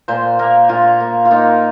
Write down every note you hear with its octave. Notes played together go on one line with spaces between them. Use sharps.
A#2 C5
A#3 A#4
A#2 F4
A#3
F4
A#3 D#4